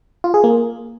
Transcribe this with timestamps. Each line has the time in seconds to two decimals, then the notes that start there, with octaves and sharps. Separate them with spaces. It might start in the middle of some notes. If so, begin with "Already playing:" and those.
0.24 F4
0.34 G#4
0.44 A#3